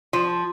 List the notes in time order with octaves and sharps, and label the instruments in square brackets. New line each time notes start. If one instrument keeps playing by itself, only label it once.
[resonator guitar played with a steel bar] F3